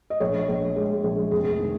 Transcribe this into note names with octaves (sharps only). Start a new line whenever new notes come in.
D#5
A#1 C#5
A#1
G#3
A#1
F1 G#4
D#3